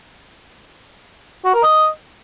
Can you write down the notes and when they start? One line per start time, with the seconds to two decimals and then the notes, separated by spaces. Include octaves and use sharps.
1.44 F#4
1.54 A#4
1.63 D#5